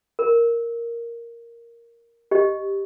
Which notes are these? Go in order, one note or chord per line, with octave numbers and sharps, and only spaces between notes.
A#4
G4 D#5